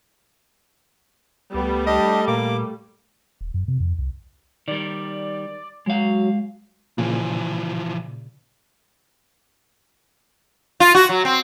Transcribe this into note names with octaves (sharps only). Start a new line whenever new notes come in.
C#2 G3 A3 B3
D4 G4 D#5
A#2 A#3 D6
D#1
F#2
C3
F2
C2
D#3 G3 D5
F#3 G#3 F5
A#2 C#3 E3 F3
F4
F#4
F#3
C4